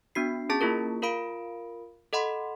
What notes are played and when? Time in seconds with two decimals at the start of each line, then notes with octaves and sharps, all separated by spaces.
0.15 B3 D4 F#4 C7
0.49 C#4 G#4 A5 A6
0.61 A#3 E4 F4 G#4 A#4
1.02 F4 A#4 F5 B5 D7
2.13 A4 D#5 F#5 B5 C6